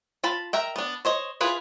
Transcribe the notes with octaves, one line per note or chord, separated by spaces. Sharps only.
F4 A5 B5
A#4 E5 G5
B3 D4
C5 C#5 D#5
E4 F4 G#4 B4